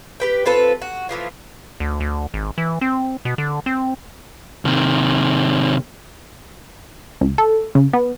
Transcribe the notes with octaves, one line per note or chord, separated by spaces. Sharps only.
G4 B4 G5
C4 F4 A4 B4
F#4
A2 E3 F3 F4
D2
D2
G#1
E3
C4
B2
D3
C4
C3 D#3
C#2
A4
C#3
B3